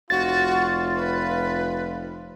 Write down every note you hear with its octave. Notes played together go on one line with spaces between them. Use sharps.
F1 F4 F#4 A6
B4